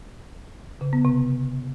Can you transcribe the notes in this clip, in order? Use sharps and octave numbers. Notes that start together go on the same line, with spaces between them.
C#3
B3
C3